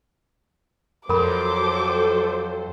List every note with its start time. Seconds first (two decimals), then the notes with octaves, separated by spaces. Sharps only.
1.09 F2 F#3 A4 A#4 C5 B5 D6